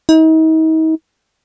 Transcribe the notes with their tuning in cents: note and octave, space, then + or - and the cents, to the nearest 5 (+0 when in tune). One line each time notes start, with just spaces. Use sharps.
D#4 +40